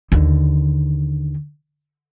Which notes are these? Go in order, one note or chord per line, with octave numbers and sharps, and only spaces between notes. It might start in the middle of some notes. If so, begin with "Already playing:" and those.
D#2 D3